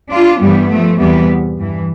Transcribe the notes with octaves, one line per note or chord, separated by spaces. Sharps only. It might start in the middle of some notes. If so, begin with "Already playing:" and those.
D4 F4
G2 E3 G3 B3
F3 A3
E2 C3 E3 G3 B3
G2 E3